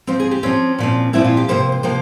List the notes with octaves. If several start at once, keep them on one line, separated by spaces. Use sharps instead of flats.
F3 C4 C5
G#4
G4
F3 C4 C#4
A#2 F3 C4
A#2 F3 C4 E4
F4
G4
C3 F3 A#3 C5
C5
C3 F3 A#3 C5